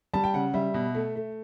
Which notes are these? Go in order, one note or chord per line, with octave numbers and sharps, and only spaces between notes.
G3 A5
G5
C#3 F#5
G3 E5
B2
A3
A3